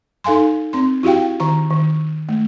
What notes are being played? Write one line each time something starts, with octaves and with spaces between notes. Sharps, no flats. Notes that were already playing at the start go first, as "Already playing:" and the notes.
D#4 A4 F5 G#5 C6
C4 C6
E4 F#4 G4 F5 G5
D#3 A#5
D#3
A3